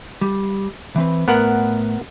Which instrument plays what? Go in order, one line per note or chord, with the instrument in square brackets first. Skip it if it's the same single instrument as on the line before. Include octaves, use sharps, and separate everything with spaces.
[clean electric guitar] G3
E3 C4 B4
[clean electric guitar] A2 [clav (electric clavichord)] B3 A#4 F#5